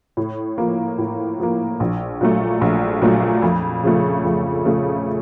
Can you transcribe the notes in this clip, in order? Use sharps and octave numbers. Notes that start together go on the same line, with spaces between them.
A2
F3 A#3
A2
F3 A#3
A#1
A#2 F#3 A3
A#1
A#2 F#3 A3
F2
C#3 F3 A3
F2
C#3 F3 A3